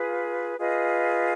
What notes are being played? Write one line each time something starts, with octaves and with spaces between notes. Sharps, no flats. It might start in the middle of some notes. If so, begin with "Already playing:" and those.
Already playing: F4 G#4 B4
F4 G#4 B4 D#5